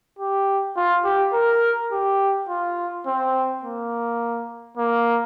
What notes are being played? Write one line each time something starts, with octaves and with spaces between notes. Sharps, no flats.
G4
F4
G4
A#4
G4
F4
C4
A#3
A#3